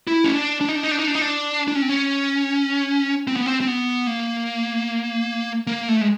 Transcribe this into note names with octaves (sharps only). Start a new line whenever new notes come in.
E4
C#4
D4
D4
D#4
D4
D#4
D4
D#4
D4
D#4
D4
D4
C#4
C4
C#4
C4
B3
C4
C4
B3
A#3
A#3
A3
G#3